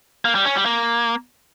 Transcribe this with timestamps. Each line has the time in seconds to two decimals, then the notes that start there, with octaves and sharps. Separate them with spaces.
0.25 A#3
0.35 G3
0.45 C#4
0.55 G3
0.66 A#3